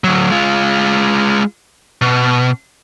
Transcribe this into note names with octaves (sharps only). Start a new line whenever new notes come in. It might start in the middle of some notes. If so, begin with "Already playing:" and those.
D2 F#3
G#3 F4
B2